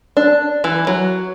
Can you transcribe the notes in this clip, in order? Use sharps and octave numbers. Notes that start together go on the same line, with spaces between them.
D4
E3
F#3